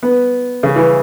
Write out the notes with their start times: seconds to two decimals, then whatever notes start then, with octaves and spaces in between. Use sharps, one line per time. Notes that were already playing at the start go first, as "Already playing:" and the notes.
0.03 B3
0.63 C#3
0.76 E3